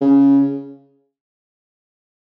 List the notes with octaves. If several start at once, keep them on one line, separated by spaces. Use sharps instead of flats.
C#3